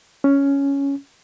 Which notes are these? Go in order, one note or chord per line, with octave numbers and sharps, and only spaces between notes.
C#4